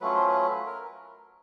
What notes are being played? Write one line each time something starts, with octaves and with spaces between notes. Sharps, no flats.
F#3 A3 C#4 F4 B4
C5
B4
A#4